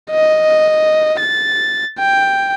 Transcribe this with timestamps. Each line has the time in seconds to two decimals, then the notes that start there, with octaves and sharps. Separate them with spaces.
0.11 D#5
1.20 A6
1.99 G5